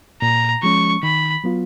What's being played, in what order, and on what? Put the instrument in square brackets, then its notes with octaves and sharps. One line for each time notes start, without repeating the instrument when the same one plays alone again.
[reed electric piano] A#2 [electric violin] A#5
[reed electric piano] F3 G#3 C#4 [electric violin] C#6
[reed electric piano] D#3 [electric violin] B5
[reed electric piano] F#3 B3 F4